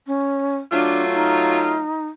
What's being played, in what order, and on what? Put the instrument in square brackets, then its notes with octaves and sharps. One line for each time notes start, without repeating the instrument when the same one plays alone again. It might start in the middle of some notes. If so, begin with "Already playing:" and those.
[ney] C#4
[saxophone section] F#3 A3 F4 [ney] D4
[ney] D#4